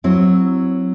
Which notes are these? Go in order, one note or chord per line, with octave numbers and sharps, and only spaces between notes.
F#3 C4 E4